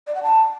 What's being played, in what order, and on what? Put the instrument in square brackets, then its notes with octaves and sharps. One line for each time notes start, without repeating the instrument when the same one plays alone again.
[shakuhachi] D5
F#5
A5